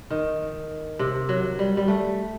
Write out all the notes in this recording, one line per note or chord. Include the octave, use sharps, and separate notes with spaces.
D#3
C3
F#3
G3
G3
A3